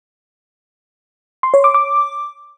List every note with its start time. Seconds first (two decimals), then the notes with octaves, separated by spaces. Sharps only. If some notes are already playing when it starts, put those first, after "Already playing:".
1.43 C6
1.54 C#5
1.64 D6
1.74 D6